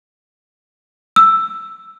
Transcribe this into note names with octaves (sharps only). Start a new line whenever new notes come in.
E6